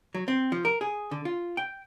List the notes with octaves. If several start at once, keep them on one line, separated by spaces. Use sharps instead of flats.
F#3
C4
F3
A#4
G#4
D3
F4
G5